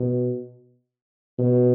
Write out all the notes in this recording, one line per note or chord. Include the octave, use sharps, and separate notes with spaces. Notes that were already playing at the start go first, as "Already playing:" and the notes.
Already playing: B2
B2